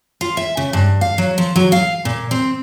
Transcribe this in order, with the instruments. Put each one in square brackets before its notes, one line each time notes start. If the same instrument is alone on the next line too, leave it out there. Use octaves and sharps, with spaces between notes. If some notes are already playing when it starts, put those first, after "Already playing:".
[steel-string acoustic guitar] F4
E5
C#3
G2
F5
F#3
F3
F#3
F5
A#2
C4